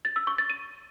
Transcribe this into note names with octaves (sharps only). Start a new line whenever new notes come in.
A6
E6
C#6
A6
D#7